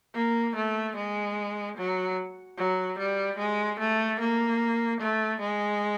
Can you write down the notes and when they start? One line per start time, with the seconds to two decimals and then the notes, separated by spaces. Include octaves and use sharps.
0.15 A#3
0.56 A3
0.96 G#3
1.77 F#3
2.58 F#3
2.99 G3
3.38 G#3
3.79 A3
4.20 A#3
5.01 A3
5.41 G#3